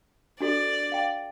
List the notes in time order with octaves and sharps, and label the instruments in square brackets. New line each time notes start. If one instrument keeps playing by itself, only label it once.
[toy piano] D4 F#4 A4 [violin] D5
[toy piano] F5 G5